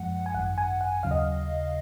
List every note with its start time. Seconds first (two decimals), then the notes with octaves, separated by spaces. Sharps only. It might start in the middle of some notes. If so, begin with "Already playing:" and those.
Already playing: F#2 F3 G#3 F#5
0.26 G#5
0.35 G#1 F#2 D#3 F#5
0.58 G#5
0.81 F#5
1.03 D#2 C#3 F#3 F5
1.11 D#5
1.19 F5